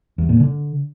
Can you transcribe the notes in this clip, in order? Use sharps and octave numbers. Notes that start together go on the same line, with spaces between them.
E2
A#2
D3